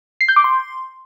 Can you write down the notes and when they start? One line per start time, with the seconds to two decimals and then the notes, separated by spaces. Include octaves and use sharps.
0.21 C7
0.28 G6
0.36 D6
0.44 C6